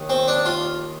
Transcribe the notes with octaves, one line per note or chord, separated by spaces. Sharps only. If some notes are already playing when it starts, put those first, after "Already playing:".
Already playing: D#2 D#3
C4
D4
F4